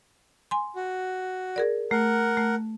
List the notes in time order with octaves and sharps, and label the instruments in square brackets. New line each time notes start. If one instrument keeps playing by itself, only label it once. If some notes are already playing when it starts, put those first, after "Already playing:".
[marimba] G#5 C6
[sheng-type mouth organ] F#4
[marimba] G#4 A#4 D5
[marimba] A3 [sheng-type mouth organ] A#4 F#5
[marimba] A3